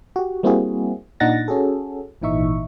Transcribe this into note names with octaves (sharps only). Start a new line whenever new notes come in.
F#4 G4
G3 A#3 C4 E4 F#4 G#4
A#2 D4 D#4 F#5 A6 A#6
C#4 F#4 G#4 A4
G#1 A#2 E3 D#4 E5 C#6